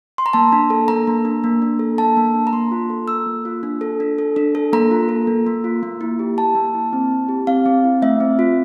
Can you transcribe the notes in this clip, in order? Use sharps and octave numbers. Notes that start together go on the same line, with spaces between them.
C6
A#5
A#3 A5
D4
A4
A#3 A#5
A#3
D4
A#3
D4
A4
A#3 A5
A#3
D4
A#5
A#3 C6
F4
A4
A#3 E6
A#3
F4
D4
A4
D4
A4
D4
A4
A#3 A#5
F4
A4
A#3
A#3
F4
A#3
E4
G4
A#3 A5
A#3
E4
C4
E4
G4
C4 F5
C4
E4
A3 E5
C4
F4